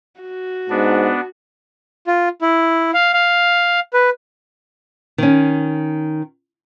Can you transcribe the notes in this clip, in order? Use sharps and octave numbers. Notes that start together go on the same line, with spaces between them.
F#4
G#2 B3 D4
F4
E4
F5
F5
B4
D#3 C#4